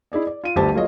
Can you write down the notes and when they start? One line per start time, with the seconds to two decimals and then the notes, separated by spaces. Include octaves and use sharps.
0.12 E4 G#4 D5 D#5
0.27 D5
0.44 F4 D#7
0.56 G1 D2 G4 C5 A5
0.74 F#3 A#3 F4 G#4 C#5 D#5